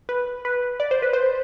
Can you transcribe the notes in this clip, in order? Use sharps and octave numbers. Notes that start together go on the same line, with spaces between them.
B4
B4
D5
C5
B4
C5